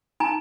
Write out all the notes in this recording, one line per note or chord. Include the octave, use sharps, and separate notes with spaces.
D#4 G#5 A#5